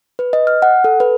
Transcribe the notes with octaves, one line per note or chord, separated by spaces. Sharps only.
B4
D#5
F6
F#5
A4
B4